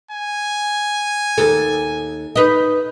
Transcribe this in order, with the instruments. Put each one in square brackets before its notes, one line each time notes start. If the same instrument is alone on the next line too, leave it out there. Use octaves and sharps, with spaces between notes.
[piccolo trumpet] G#5
[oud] D#2 A4
D#4 B4